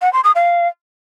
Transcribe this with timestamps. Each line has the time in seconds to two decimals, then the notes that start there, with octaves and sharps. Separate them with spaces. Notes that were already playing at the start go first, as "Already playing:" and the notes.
0.02 F#5
0.13 C6
0.24 D#6
0.35 F5